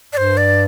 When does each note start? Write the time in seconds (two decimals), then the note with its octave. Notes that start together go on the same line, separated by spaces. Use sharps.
0.13 G2 C5 D5
0.37 D5